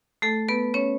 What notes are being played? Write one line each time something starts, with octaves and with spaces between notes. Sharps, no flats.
A3 A4
B3 B4
C#4 C#5